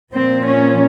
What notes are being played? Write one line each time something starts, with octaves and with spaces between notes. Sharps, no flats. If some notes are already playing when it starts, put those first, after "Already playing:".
A#2 F3 C4
C#4